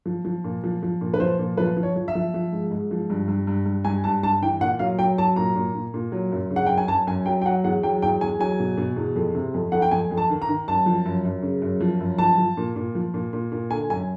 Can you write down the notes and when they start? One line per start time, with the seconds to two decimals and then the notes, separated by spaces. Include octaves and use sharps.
0.06 F3
0.25 F3
0.44 A#2
0.64 F3
0.83 F3
1.01 A#2
1.14 B4
1.20 F3 C5
1.39 A#2
1.57 F3 B4
1.77 F3
1.83 C#5
1.96 F3
2.08 E5
2.15 F3
2.34 F3
2.52 G#2
2.71 G#2
2.91 F3
3.10 G2
3.28 G2
3.47 G2
3.66 G2
3.85 G2 G#5
4.04 G2 A5
4.23 G2 A5
4.42 E3 G5
4.61 A#2 F#5
4.79 F#3 F5
4.99 F#3 G5
5.18 F#3 A5
5.36 A#2 A#5
5.56 A#2
5.75 A#2
5.94 A#2
6.12 F#3
6.32 F#2
6.50 C#3
6.56 F#5
6.66 F#2 G5
6.78 G#5
6.88 F#2 A5
7.07 F#2 G#5
7.26 F#3 G5
7.42 G5
7.46 F#3 F#5
7.64 E2 F#5
7.83 F#3 G5
8.02 E2 G5
8.21 E2 G#5
8.39 F#3 G#5
8.60 B2
8.77 B2
8.96 E2
9.16 F2
9.35 C3
9.54 F2
9.72 F2 F#5
9.82 G5
9.91 F2 G#5
10.11 F2
10.17 A5
10.30 D#3
10.42 A#5
10.49 D#3
10.68 F#2 A5
10.86 F3
11.06 F#2
11.25 F#2
11.43 C#3
11.62 F#2
11.81 F3
12.01 F#2
12.18 F3 A5
12.38 F3
12.57 A#2
12.76 A#2
12.95 F3
13.14 A#2
13.33 A#2
13.52 A#2
13.70 D3 G#5
13.90 F#2 G#5